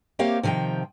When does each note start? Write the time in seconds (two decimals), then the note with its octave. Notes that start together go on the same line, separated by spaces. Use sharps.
0.19 A#3 C4 G4 C#5 F5
0.43 C3 D#3 F3 D#5 G5